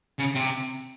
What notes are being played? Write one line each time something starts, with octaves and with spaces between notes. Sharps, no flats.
C#3
C3